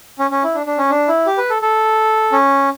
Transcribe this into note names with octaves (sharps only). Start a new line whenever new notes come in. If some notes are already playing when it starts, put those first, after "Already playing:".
C#4
C#4
E4
D4
D4
C#4
D4
E4
G4
B4
A4
A4
C#4